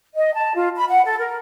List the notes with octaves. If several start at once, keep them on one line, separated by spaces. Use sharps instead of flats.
D#5
A5
F4
B5
F#5
A4
A#4